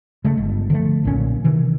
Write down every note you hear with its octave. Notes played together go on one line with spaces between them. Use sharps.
C#3 G#3 A3
G1
D3 F3 A3
B1 A#2 E3 C#4
C3 D#3 E3